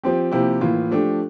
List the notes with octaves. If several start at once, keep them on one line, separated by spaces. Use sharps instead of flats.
F3 C4 G4
C3 F3 A#3 E4 G4
A2 E3 A#3 F4
F3 A3 D4 G4